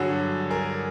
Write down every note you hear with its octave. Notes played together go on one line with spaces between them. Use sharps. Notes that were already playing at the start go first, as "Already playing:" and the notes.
Already playing: G2 D3 F#3 F#4 G#4
G#4 A#4